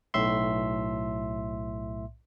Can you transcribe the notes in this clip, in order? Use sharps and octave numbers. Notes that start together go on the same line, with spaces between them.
B1 A2 E5 C6